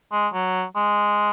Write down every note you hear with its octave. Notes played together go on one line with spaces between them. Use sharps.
G#3
F#3
G#3